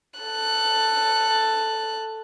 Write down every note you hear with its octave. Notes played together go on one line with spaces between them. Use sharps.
A4 F#6